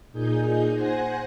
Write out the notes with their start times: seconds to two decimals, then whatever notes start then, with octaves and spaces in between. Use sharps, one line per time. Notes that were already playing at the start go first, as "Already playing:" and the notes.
0.12 A#2 D#4 G#4 G6
0.74 C5 F#5 G#5 A#6